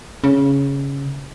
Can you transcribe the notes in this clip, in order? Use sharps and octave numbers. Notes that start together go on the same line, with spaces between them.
C#3